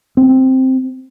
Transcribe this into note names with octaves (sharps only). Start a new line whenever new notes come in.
C4